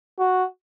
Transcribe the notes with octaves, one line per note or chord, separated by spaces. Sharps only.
F#4